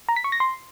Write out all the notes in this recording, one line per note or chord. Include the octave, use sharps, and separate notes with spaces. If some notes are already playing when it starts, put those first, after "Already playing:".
A#5
B6
C#6
A#6
C6